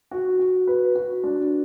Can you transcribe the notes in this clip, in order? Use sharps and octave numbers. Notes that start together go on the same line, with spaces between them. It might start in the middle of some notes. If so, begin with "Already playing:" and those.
F#4
F#4
B4
F#4
D4